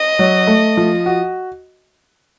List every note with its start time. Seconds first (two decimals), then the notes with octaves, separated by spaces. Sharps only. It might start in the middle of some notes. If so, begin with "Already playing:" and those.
Already playing: D#5
0.19 F#3
0.47 A3
0.77 F3
1.06 F#4